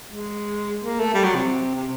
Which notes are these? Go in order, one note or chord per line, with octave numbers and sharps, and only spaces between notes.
G#3
A#3
A3
G3
F#3
C3
C3